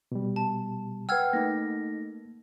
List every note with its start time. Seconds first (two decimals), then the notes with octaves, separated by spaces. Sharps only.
0.12 B2 G3
0.36 A5
1.09 B4 F#5 G5 E6 F6 G#6
1.33 A3 A#3 D#4 A#6